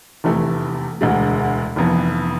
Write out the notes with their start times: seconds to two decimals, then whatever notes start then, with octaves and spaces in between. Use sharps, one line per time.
0.24 F1 E2 C3 E3 A3
1.01 E1 D2 D3 G#3
1.76 F1 F2 E3 B3